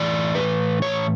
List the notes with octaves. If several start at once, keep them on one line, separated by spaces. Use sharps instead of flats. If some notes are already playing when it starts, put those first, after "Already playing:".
Already playing: A2 E3 D5
B4
C#5